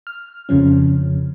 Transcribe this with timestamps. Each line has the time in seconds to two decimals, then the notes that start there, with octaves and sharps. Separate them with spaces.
0.07 F6
0.49 F2 C#3 F3 C#4